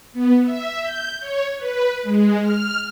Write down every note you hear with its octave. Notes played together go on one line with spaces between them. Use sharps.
B3
E5
G6
C#5
B4
G#3
F6